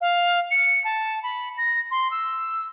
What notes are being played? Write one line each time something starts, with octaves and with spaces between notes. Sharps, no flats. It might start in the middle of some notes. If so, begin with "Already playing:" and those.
F5
C#7
A5
B5
A#6
C6
E6